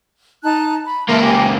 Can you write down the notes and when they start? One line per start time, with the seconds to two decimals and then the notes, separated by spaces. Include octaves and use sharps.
0.43 D#4 A5 F#6
0.83 B5
1.09 C#2 A#3 E5 A5 C6
1.22 G4 G5 G#5